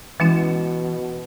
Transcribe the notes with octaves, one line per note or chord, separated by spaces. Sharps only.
B2 E3 G#3 C#4 E4